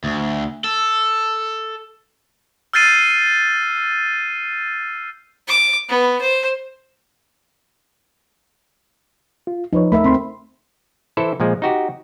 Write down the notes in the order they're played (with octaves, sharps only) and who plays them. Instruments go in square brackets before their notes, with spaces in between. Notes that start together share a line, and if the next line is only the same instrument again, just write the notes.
[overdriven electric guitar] D2
A4
[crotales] E6 F6 G6 A6 C7 D#7
[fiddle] D6
B3
C5
[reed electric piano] F4
[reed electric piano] F3 B4 C#5 [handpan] D#4
[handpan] A3 A#4 E5 [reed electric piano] B5
[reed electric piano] D2 B5 C6 [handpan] C4
[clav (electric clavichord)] E3 E4 A4 C5
A#2 F3 G#3
D#4 F#4 G4